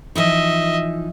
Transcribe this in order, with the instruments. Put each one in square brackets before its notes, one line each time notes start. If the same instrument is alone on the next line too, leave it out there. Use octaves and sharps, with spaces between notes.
[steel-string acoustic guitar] E3 F3 D#4 [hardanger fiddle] D#5 E5